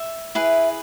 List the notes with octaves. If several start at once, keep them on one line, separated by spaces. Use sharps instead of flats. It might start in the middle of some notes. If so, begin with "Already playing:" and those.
Already playing: E5
E4 G#4 B4